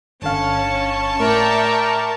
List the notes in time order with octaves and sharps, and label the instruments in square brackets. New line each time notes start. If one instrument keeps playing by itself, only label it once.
[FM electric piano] G1 D3 F5 [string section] C#4 [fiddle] A5 C#6
[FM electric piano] A2 [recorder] A#4 [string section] D5 E5 G5